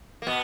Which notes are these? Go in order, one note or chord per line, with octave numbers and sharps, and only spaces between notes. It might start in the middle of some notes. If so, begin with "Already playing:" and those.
A#3
B2 B3